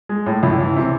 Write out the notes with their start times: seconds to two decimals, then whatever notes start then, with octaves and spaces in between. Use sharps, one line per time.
0.09 G#3
0.26 A2
0.43 C#2 E4
0.59 E3
0.76 C3